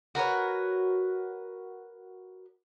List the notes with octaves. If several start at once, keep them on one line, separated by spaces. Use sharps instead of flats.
F#4 A#4 B4 C#5